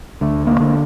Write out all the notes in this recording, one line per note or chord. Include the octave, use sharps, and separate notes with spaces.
D2 A3
A#3
D3